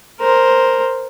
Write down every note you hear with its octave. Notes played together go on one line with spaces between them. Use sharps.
A#4 C5